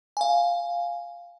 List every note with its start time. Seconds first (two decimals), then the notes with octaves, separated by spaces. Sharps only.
0.17 F5 G#5